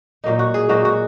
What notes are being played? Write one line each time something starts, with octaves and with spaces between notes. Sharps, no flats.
A#2 F#3 A#3 D#4
F#4
G#4
A#2 F#3 A#3 D#4 F#4
F#4